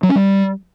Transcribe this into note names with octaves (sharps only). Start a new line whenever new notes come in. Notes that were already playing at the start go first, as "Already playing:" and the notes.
F#3
C#4
G3